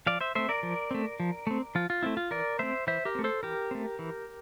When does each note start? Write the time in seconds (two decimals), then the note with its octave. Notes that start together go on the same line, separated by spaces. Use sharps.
0.06 F3 D5 F5
0.21 C5 E5
0.35 A3 C4 C5 E5
0.49 A#4 D5
0.63 F3
0.91 A3 C4
1.20 F3
1.47 A3 C4
1.75 F3 F4
1.90 F4
2.03 A3 C4 E4
2.17 F4
2.31 E3 A#4 D5
2.59 A3 C4 C5 E5
2.87 E3 C5 E5
3.05 G4 A#4
3.15 A3 C4
3.24 A4 C5
3.43 E3 G4 A#4
3.71 A3 C4
3.99 E3